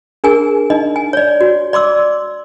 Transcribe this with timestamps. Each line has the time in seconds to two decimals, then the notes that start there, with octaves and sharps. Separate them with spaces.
0.24 D4 G#4 A#4 G#5
0.70 D4 D#4 D#5
0.96 G#5
1.13 C#5 D5
1.41 F#4
1.73 D5 C6 D6 E6